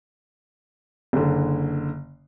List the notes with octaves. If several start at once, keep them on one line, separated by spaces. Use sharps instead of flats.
F#1 D3